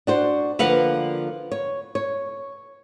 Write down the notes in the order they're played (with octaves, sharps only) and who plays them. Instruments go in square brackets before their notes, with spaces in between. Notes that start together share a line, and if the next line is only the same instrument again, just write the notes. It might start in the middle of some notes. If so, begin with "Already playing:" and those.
[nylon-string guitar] D4 F#4 C5
[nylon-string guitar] D3 F3 A#3 [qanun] B4 F5 F#5
[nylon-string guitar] C#5
C#5